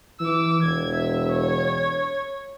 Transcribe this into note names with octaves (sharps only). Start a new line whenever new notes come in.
E3 D6 E6
E1 G#6
E5
C#5